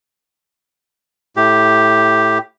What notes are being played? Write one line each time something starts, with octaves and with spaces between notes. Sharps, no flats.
A2 G4